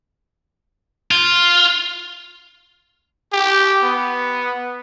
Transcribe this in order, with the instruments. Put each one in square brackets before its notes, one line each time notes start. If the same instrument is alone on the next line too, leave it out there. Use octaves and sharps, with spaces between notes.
[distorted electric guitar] F4
[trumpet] G4
B3